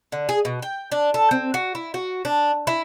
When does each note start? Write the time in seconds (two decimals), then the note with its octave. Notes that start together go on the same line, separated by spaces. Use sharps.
0.12 D3
0.29 G#4
0.45 B2
0.62 G5
0.92 D4
1.14 A4
1.31 C4
1.54 F#4
1.75 E4
1.94 F#4
2.25 D4
2.67 E4